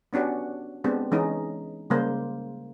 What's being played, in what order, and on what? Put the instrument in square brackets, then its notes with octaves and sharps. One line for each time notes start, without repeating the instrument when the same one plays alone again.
[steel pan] B3 C#4 D4 F#4 G4
G#3 B3 C4 D4 G4
E3 G#3 C#4 D#4
C#3 G3 G#3 A#3 C5